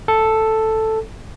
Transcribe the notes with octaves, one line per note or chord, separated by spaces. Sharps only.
A4